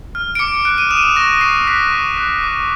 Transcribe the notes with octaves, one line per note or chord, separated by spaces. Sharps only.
F6
D7
D6 C#7
F#6 D7
D#7
D#6 E7
D#7
E7
C#6 A#6
C#6 C7
F#6 B6
C#6
F#6
D6